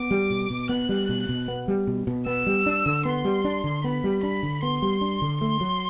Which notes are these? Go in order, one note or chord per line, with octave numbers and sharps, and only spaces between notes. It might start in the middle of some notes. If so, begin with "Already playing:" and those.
Already playing: B3 D6
G3
B2
B2
B3 F#6
G3
B2
B2
B3
G3
B2
B2
B3 E6
G3
D4
D3
B3 C6
G3
D4
D3
B3 B5
G3
D4 B5
D3
B3 C6
G3
D4
D3
A3 C6
F#3